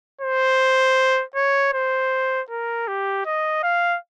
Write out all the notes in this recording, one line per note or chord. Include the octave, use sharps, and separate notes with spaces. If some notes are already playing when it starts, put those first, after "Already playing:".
C5
C#5
C5
A#4
G4
D#5
F5